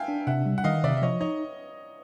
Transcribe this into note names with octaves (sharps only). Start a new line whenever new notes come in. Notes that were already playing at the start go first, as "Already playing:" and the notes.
Already playing: E5 F5 G5 G#5
D4
C3 E5 F#5
G3
F#5
D#3 D#5 F5
C3 D5 E5
E5
F3 C#5 D#5
D#4 C#5 D#5